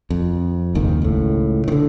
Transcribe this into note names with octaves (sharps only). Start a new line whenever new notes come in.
F2
F#1 D#2 G#2 D#3
C#2 A2
D3 D#3